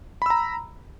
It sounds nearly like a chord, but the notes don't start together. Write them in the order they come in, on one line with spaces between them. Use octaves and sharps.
B5 E6 A#5